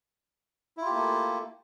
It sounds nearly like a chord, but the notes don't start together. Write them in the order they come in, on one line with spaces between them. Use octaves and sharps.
E4 F4 G4 A#3 A3